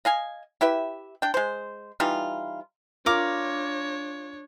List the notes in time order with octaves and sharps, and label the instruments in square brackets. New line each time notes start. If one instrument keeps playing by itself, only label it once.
[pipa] D#5 F5 G#5
E4 G4 B4 E5
D4 G5
G#3 C5
E3 G3 D#4 F4
[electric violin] D4 C#5 [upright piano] F4 [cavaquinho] A#4 D6